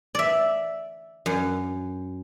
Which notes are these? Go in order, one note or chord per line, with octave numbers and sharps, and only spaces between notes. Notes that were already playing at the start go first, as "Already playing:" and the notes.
D5 E5
F#2